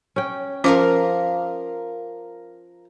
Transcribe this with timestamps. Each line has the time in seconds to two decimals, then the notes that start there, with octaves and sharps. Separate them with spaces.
0.16 C#4 G5
0.64 F3 C#4 A#4 F5 A#5 D6